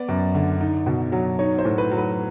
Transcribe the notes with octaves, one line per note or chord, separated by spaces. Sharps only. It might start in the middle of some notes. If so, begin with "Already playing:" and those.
Already playing: B3 D5
F#2
D3
D#4
B2
F#3
D#4 C#5
C5
A2
B4
F#3
B4